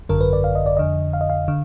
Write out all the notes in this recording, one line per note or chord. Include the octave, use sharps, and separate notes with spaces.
G#1 F#2 D3 A#4
B4
D5
F5
D#5
D5
F2 D3 D#5
F5
D#5
F5
D3